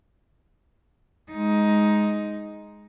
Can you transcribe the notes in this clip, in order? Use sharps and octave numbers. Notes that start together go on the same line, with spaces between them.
G#3 D#4